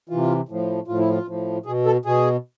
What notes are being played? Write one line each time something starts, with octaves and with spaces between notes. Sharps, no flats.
C3 E3 F4
A2 F3
A2 F3 F4
E4
F4
A2 F3
B2 G#4
A4
B2 G#4